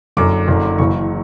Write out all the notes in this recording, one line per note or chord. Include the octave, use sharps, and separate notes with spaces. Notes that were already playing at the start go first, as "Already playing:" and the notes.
F#1 F#2 D3 D6
F#1 F#2 D3
F#1 F#2 C#3 E3 C#6